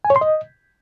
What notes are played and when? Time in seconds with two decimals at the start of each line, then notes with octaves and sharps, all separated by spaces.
0.05 G#5
0.10 C#5
0.16 C6
0.21 D#5